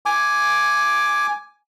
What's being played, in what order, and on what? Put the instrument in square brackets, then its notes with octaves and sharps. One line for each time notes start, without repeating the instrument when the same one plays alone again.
[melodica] G#5 D6